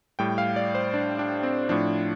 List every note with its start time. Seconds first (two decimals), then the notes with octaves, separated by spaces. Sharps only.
0.19 A2 G3 G5
0.38 F5
0.56 D5
0.75 C5
0.94 D4
1.19 D4
1.43 C4
1.69 A2 F3 D4